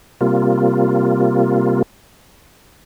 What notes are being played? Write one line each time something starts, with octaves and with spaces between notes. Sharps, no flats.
C3 G3 A#3 F4